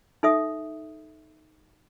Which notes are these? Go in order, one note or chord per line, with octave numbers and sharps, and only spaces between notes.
D#4 A4 E5 D#6